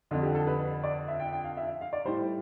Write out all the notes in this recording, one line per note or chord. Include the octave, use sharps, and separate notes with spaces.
F2 D3 F3 F4
G4
A4
B4
B4
D5
E5
G5
G5
F5
E5
E5
F5
D5
A2 G3 C5